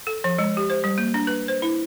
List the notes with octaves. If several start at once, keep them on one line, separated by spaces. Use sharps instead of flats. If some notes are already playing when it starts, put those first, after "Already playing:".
A4
F3
G#3
G4
C5
G3
A#3
D4
B4
C5
E4